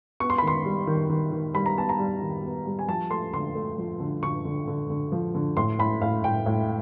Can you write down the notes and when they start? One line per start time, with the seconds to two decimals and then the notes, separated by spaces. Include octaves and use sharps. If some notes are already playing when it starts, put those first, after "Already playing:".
0.20 B3 C#6
0.30 C6
0.38 B5
0.43 D#3 C6
0.65 G3
0.87 D#3
1.10 D#3
1.32 D#3
1.54 G3 B5
1.66 A#5
1.77 B3 A5
1.89 A#5
1.99 G3
2.22 D#3
2.44 B3
2.66 G3
2.79 G#5
2.88 F3 A5
3.10 A3 C6
3.33 D3 C6
3.55 A3
3.78 F3
4.00 D3
4.23 D3 C#6
4.45 D3
4.67 D3
4.90 D3
5.12 F3
5.34 D3
5.57 A2 C6
5.79 A2 B5
6.01 A2 F5
6.24 A2 G5
6.46 A2